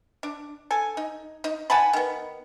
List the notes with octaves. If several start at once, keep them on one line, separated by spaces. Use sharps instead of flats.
D4
A4 G#5
D#4
D#4
F#5 G#5 A5 B5
D#3 B3